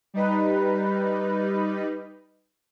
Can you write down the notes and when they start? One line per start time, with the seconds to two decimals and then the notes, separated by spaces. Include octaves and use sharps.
0.14 G3 D#4 B4